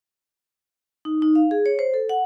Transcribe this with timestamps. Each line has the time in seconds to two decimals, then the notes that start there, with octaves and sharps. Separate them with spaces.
1.05 D#4
1.22 D#4
1.35 F5
1.51 G#4
1.66 C#5
1.79 C5
1.94 A4
2.09 F#5